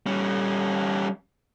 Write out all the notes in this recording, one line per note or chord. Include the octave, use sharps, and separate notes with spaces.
G3 C#4